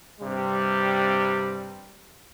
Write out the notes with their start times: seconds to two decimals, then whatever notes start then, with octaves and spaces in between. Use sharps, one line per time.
0.21 G2 C3 G3